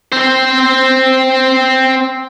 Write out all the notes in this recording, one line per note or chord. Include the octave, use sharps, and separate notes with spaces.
C4 C5